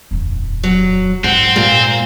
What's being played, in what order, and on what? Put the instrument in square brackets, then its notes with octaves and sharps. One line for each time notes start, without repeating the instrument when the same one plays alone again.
[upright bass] D#1 F2
[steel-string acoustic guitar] F#3
[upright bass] E2 G#2 [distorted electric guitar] C4 [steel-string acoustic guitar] F#5
[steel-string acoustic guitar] A#2 A#3